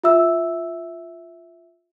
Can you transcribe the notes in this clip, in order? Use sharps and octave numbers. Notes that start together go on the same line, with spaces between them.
F4 E5 E6